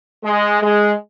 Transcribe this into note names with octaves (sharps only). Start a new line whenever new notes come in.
G#3
G#3